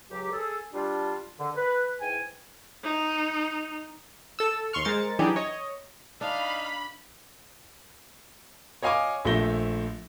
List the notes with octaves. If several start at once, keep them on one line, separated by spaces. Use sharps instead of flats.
C#2 F#3 G4
G#4 A4
G3 D4 F4
D3
B4
G#2 E3 G5 G#5
D#4
A4 E6
D#2 C6 C#6 F6
G#3 A#4 C5 A6 C#7
E3 F#3 D4 D#4 G4 G#4
C#5 D#5
D4 D#4 F5 B5
C#5 D#5 F5 G#5 C#6 D6
A#1 F3 A3 E5 A#6 G7